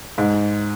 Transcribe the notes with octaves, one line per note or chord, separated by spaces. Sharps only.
G#2